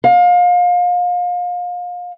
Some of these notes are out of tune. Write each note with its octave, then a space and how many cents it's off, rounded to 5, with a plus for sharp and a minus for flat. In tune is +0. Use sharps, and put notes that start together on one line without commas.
F5 +30